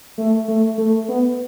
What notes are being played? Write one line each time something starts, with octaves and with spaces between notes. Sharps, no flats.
A3
A3
A3
B3